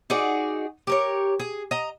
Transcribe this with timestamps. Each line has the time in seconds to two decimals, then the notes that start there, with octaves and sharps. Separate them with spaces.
0.10 D#4 F#4 G#4 D5
0.87 G4 A#4 C#5
1.39 G#4
1.71 D#5 A#5